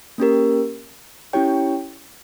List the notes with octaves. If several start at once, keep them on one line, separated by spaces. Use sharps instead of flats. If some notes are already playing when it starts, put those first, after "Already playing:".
A#3 C#4 G4 A#4
C#4 E4 G4 C#5 G5